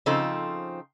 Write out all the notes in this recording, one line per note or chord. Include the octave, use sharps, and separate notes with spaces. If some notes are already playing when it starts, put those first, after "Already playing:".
C#3 F3 C4 D#4 A4